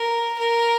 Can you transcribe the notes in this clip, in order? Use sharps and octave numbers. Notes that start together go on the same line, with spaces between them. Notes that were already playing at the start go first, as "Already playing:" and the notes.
Already playing: A#4
A#4